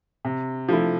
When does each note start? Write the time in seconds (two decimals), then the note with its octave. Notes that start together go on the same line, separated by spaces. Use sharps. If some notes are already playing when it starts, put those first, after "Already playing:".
0.25 C3
0.69 F3 A3 E4